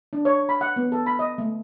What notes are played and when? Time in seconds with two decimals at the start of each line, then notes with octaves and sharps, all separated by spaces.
0.13 D4
0.25 C#5
0.49 B5
0.61 F#5
0.76 B3
0.92 A4
1.06 B5
1.19 D#5
1.38 A3